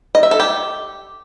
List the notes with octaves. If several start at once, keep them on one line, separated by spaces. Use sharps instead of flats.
D#5
E5
A4
G4